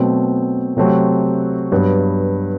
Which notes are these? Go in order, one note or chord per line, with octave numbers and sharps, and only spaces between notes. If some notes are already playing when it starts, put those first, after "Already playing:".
Already playing: B2 F#3 A3 C4
C3 F#3 A3 C4 F#4
G2 F#3 B3